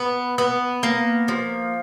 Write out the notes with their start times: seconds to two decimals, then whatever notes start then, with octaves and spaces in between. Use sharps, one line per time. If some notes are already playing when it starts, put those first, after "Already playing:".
Already playing: B3
0.38 B3
0.83 A#3
1.28 F3